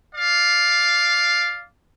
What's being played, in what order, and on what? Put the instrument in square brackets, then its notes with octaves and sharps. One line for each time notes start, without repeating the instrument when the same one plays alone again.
[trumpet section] D5 F5